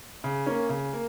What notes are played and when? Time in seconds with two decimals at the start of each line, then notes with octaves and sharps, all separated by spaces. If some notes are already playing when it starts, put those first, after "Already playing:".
0.24 C#3
0.46 A#3 C#4
0.69 C#3
0.93 A#3